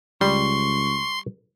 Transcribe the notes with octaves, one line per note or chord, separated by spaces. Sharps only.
C#2 G3 C6 C#6